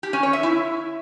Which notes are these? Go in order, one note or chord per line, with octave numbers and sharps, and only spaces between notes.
G4
C#4
C#5
E5
E4